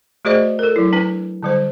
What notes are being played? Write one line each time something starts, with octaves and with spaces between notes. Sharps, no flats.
A3 F#4 G#4 C5 D5 D#5
A4 A#4
F#3 E4
D4 B4 G#5
D3 G3 C5